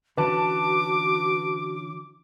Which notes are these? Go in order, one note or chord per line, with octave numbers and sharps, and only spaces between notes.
D3 E3 C#4 F#4 B4 A5 D6